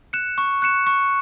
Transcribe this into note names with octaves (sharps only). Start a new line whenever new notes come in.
F#6 C#7 E7
C#6
F#6 C#7 E7
C#6